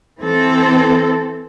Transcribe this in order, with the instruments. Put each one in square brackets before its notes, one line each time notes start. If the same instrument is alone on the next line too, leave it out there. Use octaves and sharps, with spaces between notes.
[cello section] E3 C4 A4